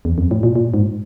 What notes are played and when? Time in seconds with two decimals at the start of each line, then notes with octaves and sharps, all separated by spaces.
0.05 E2
0.18 F2
0.31 A2
0.43 A#2
0.56 A#2
0.74 G#2